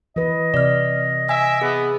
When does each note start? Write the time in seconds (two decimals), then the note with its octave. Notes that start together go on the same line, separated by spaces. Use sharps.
0.16 E3 B4 D#5
0.54 C3 D5 F6
1.29 E5 G#5
1.61 B3 G#4